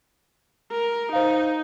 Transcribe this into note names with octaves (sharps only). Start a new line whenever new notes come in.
A#4
D#4 C5 F5